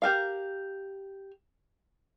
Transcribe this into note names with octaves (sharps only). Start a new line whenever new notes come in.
G4 A#4 F5